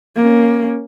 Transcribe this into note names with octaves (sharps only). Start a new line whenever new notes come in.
A#3 C#4